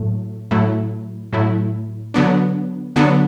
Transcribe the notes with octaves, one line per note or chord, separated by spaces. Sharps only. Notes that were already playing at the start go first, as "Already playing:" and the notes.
Already playing: A2 F#3 A3
A2 F#3 A3 E4
A2 F#3 A3 E4
D3 F#3 B3 D4
D3 F#3 B3 D4